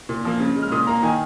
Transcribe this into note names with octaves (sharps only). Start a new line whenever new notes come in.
A#2
F3 A#3
C#3
G#3
F6
A#2 D#6
A#3 A#5
D#3 G#5